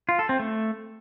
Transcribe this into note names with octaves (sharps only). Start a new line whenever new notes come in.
F4
A4
C4
A3